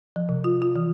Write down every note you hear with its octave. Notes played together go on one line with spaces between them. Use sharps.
F3
C3
F4
F4
E3